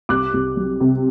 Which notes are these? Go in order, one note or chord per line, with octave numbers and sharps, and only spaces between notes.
C2 D6 F#6
C2
F#3
C3